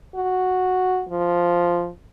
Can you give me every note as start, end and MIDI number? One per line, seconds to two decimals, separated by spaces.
0.16 1.04 66
1.09 1.89 53